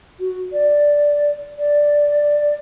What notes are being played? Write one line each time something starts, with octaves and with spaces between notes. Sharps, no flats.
F#4
D5
D5